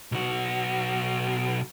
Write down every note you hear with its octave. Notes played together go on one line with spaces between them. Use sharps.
B1 F#4